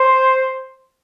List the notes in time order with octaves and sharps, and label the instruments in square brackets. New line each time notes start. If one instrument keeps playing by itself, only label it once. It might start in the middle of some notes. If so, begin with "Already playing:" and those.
Already playing: [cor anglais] C5